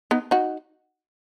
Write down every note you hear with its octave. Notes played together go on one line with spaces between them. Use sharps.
B3 D#4
D#4 F#4